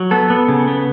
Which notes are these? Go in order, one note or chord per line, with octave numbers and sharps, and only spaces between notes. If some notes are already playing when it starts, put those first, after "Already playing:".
Already playing: F#3
B3 A4
B3
C#3
B3